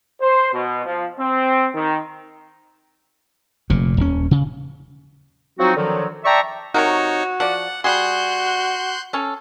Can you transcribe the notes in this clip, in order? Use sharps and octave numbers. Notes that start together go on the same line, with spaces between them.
C5
B2
F3
C4
D#3
F1 A#2
D#1 C#4
C#3
F3 F#3 C4 D#4 F#4
D3 D#3 F3 F#3
D5 E5 G5 A5 A#5 C#6
C3 D#4 F#4 A#4 C#5
F3 D5 F#5
G3 F#4 G#4 C6 F#6 G6
C#4 A4